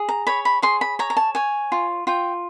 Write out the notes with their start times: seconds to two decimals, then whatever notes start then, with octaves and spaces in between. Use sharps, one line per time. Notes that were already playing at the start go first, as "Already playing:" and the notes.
Already playing: G#4
0.09 A#5
0.27 C#5 B5
0.45 B5
0.62 G#4 C6
0.81 B5
0.99 C#5 A#5
1.10 A#5
1.17 A5
1.35 C#5 G#5
1.72 F4
2.07 F4 G5